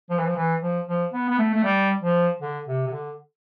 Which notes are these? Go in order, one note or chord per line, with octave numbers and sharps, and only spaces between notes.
F3
E3
F3
E3
F3
F3
B3
B3
A3
A3
G3
F3
D3
C3
C3
D3